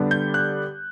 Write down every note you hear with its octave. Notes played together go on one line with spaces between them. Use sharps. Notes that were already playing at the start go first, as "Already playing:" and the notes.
Already playing: D3 G3 B3 D4
G6
F#6